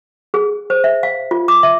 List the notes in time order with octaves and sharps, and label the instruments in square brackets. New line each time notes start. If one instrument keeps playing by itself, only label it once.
[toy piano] G#4
C5
E5
F5
F4
D6
E5